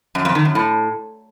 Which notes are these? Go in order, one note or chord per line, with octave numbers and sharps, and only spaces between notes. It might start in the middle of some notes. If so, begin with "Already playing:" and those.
F#2
F2
D#3
F#2
A2